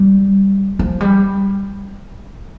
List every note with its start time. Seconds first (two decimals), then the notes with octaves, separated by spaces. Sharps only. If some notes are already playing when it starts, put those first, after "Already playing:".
Already playing: G3
0.79 F3
1.01 G3